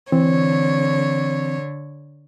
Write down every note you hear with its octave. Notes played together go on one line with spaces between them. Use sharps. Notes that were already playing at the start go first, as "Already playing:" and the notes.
D3 E3 C4 C#5